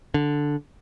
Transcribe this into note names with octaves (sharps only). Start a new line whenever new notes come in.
D3